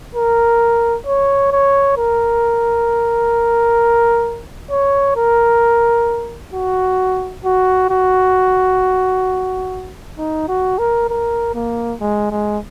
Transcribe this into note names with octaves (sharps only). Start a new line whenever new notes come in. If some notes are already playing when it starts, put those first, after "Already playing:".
A#4
C#5
C#5
A#4
C#5
A#4
F#4
F#4
F#4
D#4
F#4
A#4
A#4
A#3
G#3
G#3